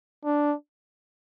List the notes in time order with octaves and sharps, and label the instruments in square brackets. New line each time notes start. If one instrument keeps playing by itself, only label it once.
[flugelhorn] D4